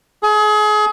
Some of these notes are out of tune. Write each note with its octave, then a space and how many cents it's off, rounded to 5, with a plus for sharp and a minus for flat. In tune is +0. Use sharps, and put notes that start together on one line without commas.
G#4 +30